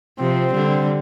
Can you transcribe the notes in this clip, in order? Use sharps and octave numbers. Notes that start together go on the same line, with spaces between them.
C3 F3 C4
D3 G3